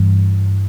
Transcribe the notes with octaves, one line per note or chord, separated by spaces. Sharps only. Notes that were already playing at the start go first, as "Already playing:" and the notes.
Already playing: G2 E3